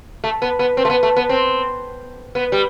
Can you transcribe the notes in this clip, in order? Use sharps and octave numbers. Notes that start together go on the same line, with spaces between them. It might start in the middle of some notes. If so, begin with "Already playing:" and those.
A3
B3
B3
C4
A3
B3
A3
B3
C4
B3
G3